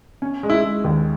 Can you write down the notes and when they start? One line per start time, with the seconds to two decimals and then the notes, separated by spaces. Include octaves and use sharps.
0.22 C#4
0.43 G#3
0.50 E4
0.64 G#3
0.84 D#2